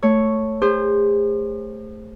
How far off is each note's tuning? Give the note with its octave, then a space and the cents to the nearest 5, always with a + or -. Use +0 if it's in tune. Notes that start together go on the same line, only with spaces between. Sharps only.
A3 +0 C#5 +0
G#4 -45 C5 +0